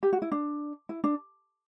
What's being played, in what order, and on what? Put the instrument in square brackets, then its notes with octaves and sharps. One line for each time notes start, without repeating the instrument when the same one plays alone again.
[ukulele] G4
F#4
E4
D4
E4
D4